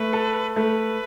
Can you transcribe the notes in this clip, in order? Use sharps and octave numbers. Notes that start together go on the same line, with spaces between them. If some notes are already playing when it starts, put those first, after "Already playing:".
Already playing: A3 B4
A4
A3 B4